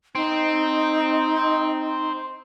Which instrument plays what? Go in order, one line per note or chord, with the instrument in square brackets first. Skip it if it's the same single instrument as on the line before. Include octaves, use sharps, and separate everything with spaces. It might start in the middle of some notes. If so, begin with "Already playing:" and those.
[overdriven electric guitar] C4 [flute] D#4